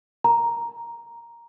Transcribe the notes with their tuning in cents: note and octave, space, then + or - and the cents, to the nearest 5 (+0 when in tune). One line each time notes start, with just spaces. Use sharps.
A#5 +5